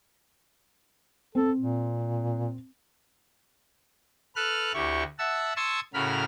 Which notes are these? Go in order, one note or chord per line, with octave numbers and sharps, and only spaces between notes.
C4 A4
A#2
A4 B4 F6 F#6
D2 E4 G4 C#6
E5 F#5 A5 E6
A5 C6 C#6 D#6 E6 G#6
A2 C#3 F#4 A#4 B5 F6